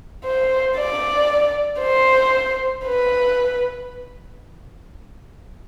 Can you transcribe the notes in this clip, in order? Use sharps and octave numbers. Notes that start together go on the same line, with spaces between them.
C5
D5
C5
B4